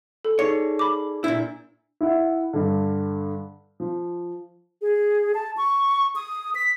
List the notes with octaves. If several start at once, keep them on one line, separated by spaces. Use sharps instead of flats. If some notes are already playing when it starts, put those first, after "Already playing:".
A4
D#4 G#4 C#5 D5
B5 D6
A#2 D4 E4
E4 E5 F#5
G2 D3
F3
G#4
A5
C#6
D#6
B6